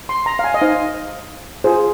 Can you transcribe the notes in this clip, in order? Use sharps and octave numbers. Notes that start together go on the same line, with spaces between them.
C6
A#5
F5
G#5
D#5
D#4 C5 F5
F4 G#4 C5